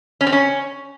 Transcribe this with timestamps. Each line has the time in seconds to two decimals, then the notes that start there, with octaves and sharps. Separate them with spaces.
0.21 C#4
0.27 C4
0.32 C#4